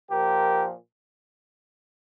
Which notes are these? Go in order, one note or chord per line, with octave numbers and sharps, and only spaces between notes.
A#2 F3 G4 A#4